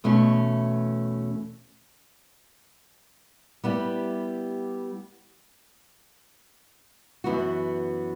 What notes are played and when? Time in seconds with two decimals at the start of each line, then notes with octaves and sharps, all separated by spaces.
0.04 E2 B2 A3 C#4
3.64 G3 B3 E4 G4
7.24 F#2 E3 B3 F#4